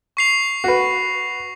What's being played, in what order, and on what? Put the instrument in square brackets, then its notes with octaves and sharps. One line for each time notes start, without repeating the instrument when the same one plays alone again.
[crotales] C#6 C7 F7
[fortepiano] F#4 B4